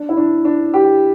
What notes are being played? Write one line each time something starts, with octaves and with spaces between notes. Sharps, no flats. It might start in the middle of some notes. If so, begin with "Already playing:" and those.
Already playing: D4
E4
D4
D4
G4